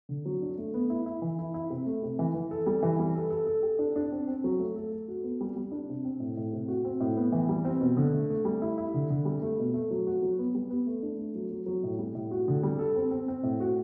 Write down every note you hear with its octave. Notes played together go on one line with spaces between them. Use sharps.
D3
F#3
D4
A3
B3
E4
E4
E3
E4
E4
C3
A3
C3
E3
E3
A4
G3
E3
G3
A4
A4
A4
G4
D4
D4
C4
C4
F#3
A3
A4
A4
F#4
B3
G3
G3
D4
C3
C4
A2
A2
C3
F#4
C4
A2
B3
E3
G3
C4
B2
D3
A3
A3
G3
E4
E4
D3
D3
G3
A3
B2
A3
F#3
F#4
F#3
B3
G3
B3
A3
D4
A3
F#3
F#3
F#3
A2
G3
A2
F#4
D3
G3
A4
C4
C4
C4
A2
F#4